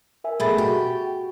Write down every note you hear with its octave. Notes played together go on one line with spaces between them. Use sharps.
A#4 E5 G#5
B2 A3 G#4 B5 A6
F#4 G4